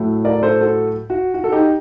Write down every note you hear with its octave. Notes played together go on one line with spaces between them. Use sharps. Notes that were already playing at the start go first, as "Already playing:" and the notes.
Already playing: A2 F#3 A3
A#4 D5
A4 C5
F#4 A4
F#4
F#4
A4
D#4 G4